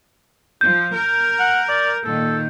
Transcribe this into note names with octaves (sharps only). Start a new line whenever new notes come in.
F3 G6
A#4
F#5
D5
A#2 D#3 A4